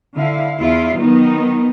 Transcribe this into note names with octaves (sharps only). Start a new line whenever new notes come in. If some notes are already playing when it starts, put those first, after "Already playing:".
D3 E4 F5
E2 E4 F4 F5
D#3 F#3 B3 D#4